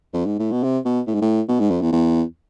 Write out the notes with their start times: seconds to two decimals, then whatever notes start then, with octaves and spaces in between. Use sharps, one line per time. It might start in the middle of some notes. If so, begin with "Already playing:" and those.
0.13 F2
0.26 G#2
0.39 A2
0.52 B2
0.63 C3
0.85 B2
1.07 A2
1.14 G#2
1.22 A2
1.49 B2
1.60 G#2
1.70 F2
1.81 E2
1.92 E2